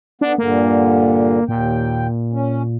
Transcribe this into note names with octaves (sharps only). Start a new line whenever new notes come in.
D3 B3 D4
G2 A#2 D3 A#3
D#2 A#2 G5
C#4